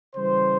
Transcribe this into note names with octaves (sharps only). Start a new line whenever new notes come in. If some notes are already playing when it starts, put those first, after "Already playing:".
C#3 E3 G3 C5